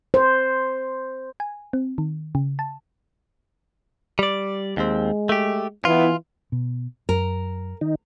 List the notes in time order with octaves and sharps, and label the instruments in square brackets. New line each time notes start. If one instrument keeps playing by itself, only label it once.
[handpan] C5
[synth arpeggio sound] G#5
C4
D#3
C#3
A5
[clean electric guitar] G3 D5
[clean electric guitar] D#2 C4 [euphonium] G#3
[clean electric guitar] A3 G4
[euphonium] E3 [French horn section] B3 E4 [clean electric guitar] F4
[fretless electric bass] B2
[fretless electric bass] F#2 [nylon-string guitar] A#4
[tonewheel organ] D#3 D#4